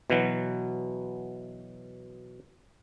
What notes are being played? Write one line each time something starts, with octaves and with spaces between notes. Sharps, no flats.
B2 E3 F#3